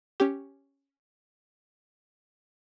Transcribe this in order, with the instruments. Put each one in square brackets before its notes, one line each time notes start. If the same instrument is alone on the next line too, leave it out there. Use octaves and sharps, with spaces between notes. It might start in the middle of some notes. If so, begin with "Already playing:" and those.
[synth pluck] C#4 G4